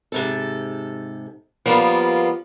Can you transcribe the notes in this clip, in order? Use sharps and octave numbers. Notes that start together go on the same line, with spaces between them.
G#2 C3 A4
F3 G3 A#3 B3 F4